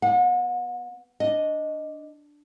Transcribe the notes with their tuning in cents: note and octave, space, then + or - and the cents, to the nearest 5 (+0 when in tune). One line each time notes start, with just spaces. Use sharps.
B3 +0 F#5 -40
D4 +0 D#5 +0